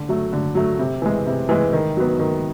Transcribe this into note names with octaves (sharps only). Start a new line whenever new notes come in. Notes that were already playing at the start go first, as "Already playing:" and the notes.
Already playing: D3
F#3 A3
D3
F#3 A3
C3
E3 G#3
C3
E3 G#3
D#3
F#3 B3
D#3